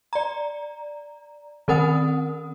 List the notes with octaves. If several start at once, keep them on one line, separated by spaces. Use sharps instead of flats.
D5 A#5
D#3 C4 A#4 F#5 D#6